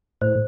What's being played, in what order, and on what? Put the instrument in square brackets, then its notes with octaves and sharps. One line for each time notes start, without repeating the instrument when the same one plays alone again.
[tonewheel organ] A2 [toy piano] C5